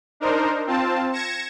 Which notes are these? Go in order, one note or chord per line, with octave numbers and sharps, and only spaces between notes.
D4 D#4 A#4 C5
C4 F4 A5
G#6 A#6 C#7 E7